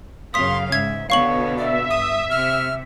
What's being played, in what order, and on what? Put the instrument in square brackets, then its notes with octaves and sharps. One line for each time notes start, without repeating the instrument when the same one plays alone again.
[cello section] F#2 C#3 F5 [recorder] C6 [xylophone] D#6 B6
[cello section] G#2 [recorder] E5 [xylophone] G#6
[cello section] B2 D3 B3 [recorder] C#5 [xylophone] F5 C#6 F#7
[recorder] D5 [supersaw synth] E5
[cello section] G2 [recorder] D#6
[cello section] C3 [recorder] F6